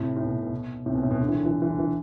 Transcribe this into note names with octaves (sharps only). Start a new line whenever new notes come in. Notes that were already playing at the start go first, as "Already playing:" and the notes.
Already playing: A2 C3
A2
B2
B2
A2 C3
B2
A2
B2
D3
E3
D3
E3
D3
E3
D3
E3